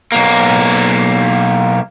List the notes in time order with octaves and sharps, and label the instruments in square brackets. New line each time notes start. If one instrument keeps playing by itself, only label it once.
[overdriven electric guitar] B1 A#3